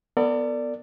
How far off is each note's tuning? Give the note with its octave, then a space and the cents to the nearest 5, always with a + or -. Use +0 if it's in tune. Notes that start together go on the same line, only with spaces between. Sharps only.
B3 +0 A4 +45 D5 +0